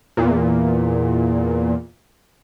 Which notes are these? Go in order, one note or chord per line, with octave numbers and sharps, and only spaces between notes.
E2 A#2